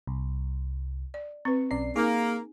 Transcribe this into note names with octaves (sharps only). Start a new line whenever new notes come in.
C2
D5
C4 B4 C#6
B1 C#4 D5 C7
A#3 D#4 G#4